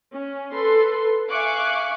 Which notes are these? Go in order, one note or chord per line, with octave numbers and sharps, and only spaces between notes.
C#4
A4 B4 C6
E5 F5 G#5 C#6 D6 F#6